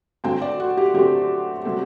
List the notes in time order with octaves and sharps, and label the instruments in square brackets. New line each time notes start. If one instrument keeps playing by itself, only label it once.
[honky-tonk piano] D3 F#3 A3 C4 [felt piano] G5
[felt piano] D5
F#4
G4
[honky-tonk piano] D3 F#3 A3 C4 [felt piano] G4
[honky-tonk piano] C3 F#3 A3 C4